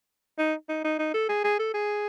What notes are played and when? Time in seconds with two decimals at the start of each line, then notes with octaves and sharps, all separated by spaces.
0.39 D#4
0.69 D#4
0.84 D#4
0.99 D#4
1.14 A4
1.29 G#4
1.44 G#4
1.59 A4
1.74 G#4